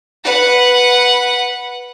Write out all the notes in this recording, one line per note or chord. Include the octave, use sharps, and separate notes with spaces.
B4 F#5